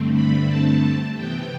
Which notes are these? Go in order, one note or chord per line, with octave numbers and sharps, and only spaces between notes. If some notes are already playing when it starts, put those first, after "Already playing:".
Already playing: G2 D3 A3 C4
B5
A5
C3 E3 B3 G5